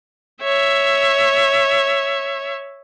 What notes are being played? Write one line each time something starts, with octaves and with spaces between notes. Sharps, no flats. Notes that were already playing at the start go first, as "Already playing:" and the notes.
C#5 E5